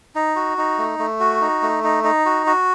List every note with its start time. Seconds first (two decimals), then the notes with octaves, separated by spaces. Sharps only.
0.15 D#4
0.36 F#4
0.58 D#4
0.78 A3
0.99 A3
1.20 F#4
1.41 D#4
1.62 A3
1.84 D#4
2.04 D#4
2.25 F#4
2.46 F#4